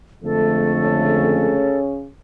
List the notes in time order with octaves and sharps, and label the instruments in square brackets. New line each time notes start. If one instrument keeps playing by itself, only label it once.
[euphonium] F2 [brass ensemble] D3 G#3 A3 [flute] A4
[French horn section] C#3 C#4